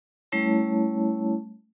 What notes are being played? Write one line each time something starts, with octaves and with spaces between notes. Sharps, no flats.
G3 A3 C#4 E4 C#5 A5